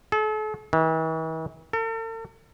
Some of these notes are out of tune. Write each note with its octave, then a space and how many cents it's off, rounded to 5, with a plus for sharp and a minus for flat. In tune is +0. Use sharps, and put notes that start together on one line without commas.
A4 -40
E3 -45
A4 +45